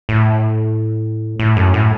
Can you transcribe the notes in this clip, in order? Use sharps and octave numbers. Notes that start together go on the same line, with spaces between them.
A2
A2
F#2
A2